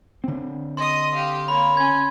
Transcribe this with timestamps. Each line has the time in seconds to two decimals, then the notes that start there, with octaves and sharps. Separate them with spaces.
0.24 D3 C4
0.77 D#5 C6 D#6
1.15 G4 F5
1.48 A#3 C#5 B5
1.77 C#4 B5 G#6